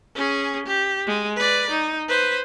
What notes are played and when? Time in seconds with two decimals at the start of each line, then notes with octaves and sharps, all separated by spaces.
0.15 C#4 G#4
0.66 G4
1.07 G#3
1.36 B4 D5
1.70 D#4
2.08 B4 C5